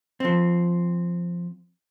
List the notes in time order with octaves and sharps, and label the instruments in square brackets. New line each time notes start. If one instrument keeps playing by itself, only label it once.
[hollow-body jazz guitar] F3 C4